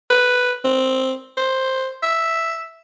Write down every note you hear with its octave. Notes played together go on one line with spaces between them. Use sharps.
B4
C4
C5
E5